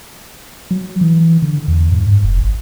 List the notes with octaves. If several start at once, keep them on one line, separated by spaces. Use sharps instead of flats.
F#3
E3
D3
E2
G#2
G2
F1
A1